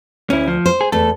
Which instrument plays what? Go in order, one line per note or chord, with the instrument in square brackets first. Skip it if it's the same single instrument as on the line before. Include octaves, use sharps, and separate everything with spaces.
[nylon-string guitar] D2 [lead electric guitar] C#4 E4
[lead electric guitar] F3
[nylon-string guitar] C5
[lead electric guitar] G#4
[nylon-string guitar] E2 A3 [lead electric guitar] A4